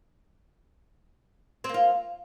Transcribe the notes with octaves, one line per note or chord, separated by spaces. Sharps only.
A#3 C4 F4